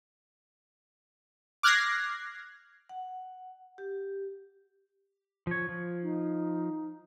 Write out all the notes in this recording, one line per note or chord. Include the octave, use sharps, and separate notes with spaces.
D6 F6 F#6 G#6 A#6 C7
F#5
G4
F3 C#5
F3
D#4